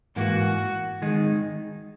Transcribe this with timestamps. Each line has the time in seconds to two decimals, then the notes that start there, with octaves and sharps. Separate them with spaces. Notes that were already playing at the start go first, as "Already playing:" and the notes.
0.16 G#2 E3 A#3 F#4
1.02 D#3 G#3 D#4